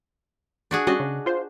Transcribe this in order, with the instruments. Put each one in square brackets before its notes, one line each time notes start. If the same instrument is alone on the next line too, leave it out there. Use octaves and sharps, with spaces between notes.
[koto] D4 F#4 G#4
[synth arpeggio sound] G3 C#4 F#4 [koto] D4 D#5
[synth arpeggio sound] C#3
F4 C5